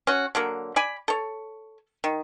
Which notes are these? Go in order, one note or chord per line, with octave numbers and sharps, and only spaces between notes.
C#4 F#4
D3 F#3 A#3
D5 G#5 B5
A4 C#5
D#3